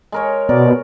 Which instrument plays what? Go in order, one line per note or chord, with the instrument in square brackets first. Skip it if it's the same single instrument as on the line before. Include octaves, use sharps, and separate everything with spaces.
[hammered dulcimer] G#3 A#4 C#5
[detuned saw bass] B2 [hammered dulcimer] A#4 [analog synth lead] D5